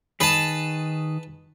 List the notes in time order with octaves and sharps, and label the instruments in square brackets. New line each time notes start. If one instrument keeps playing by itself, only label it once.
[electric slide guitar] D#3 G#4 [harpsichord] B4 A5